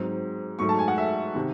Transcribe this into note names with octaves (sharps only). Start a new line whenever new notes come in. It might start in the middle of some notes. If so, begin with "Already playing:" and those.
Already playing: G#2 F#3 C4
G#2 F#3 A3 C#6
A5
G#5
F#5
E5
C3 D#3